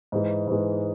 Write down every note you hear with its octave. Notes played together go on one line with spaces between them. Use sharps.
G#2 E3 G#3
G#2 E3 G#3